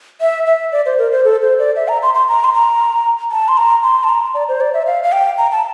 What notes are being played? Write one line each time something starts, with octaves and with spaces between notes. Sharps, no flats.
E5
E5
D5
C5
A#4
C5
A4
C5
D5
E5
A#5
C6
C6
A#5
C6
A#5
A5
C6
A#5
C6
A5
A#5
D5
C5
D5
E5
F5
F5
G5
A#5
A5